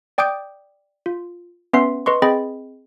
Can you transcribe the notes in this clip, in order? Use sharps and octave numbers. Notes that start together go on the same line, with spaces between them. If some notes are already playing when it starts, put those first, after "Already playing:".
D5 G5 D6 D#6 G6 D7
F4
B3 C#4 B4 E5 C6 C7
B4 D#5 C6 C#6
C4 G#4 D#5 G5 B5 A6